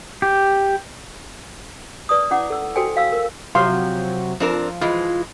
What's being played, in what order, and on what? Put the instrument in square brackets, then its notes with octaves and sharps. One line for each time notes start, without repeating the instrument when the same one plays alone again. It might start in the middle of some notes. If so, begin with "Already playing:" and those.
[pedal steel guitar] G4
[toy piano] B4 D5 A5 D#6
C#4 E4 F#5 D6
A4 E6
F#4 A4 C5 G5 G#5
F5 E6
A#4
[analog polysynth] C3 F#3 [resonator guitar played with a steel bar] F3 [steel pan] F5 C6
[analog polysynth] F3 [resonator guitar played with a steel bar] C4 D4 A#4
[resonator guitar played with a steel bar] E3 G#3 [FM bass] F4